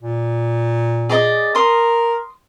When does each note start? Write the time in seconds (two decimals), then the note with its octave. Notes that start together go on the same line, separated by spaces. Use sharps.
0.02 A#2
1.10 G#4 D5 D#5
1.55 A#4 C6 D#6